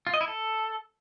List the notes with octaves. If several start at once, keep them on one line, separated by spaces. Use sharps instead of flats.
F4
D#5
E4
A4